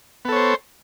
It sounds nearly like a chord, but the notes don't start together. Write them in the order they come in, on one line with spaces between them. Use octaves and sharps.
B3 A4 C#5 C5